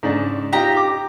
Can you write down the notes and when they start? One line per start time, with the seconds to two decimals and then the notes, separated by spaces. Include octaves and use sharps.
0.03 G#2 C#3 D4
0.53 D#4 F4 G4 A#5
0.77 D6